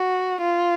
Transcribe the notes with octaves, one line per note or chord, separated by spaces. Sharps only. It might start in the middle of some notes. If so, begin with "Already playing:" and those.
Already playing: F#4
F4